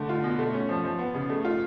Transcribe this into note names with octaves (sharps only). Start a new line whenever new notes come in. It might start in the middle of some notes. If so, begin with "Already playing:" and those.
Already playing: D3 A3
F4
B2
A3
C#4
F3
F3
B3
C#3
A3
F4